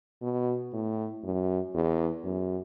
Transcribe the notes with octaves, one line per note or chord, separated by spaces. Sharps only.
B2
A2
F#2
E2
F#2